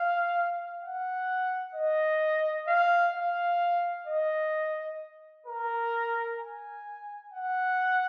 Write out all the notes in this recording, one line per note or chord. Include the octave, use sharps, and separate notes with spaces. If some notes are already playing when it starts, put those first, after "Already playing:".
Already playing: F5
F#5
D#5
F5
F5
D#5
A#4
G#5
F#5